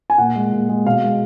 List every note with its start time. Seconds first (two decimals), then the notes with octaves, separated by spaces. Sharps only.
0.10 G#5
0.18 A#2 F#5
0.35 G#3
0.52 A#2
0.69 G#3
0.86 B2 F5
1.03 G#3